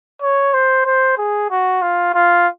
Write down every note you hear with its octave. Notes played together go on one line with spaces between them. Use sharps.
C#5
C5
C5
G#4
F#4
F4
F4